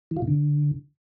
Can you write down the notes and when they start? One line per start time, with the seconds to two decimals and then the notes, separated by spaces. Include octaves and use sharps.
0.11 E3
0.17 F4
0.22 B2
0.28 D3